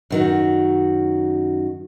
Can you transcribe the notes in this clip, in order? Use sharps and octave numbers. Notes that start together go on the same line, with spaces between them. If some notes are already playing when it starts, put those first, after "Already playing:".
F#2 D#3 F#4